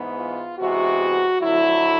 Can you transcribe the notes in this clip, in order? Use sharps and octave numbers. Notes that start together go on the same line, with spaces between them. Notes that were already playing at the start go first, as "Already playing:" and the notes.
Already playing: G#2 E3 G#3 B3
F4
C3 E3 G#3 B3 F#4
F2 D3 F#3 E4